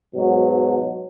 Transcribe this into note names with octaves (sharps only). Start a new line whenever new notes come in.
G#2 B2 F#3